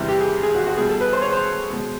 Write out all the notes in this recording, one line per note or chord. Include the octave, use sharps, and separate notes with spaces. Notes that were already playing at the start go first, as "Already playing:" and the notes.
Already playing: E2 C3 E3 G3
G4
G#4
G#4
F#4
F#4
B2 G3 G#4
A4
B4
C5
C#5
C5
B2 G#3